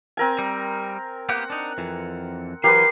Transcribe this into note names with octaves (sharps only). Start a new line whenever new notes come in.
C4 A#4 G#5
G3
A#3 B3 G4 F#5
D4 D#4
F2 E3
E3 F#3 G4 A#4 B4 C7